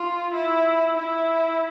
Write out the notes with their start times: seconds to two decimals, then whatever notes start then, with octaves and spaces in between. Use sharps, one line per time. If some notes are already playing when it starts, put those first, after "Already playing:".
Already playing: F4
0.34 E4
0.96 E4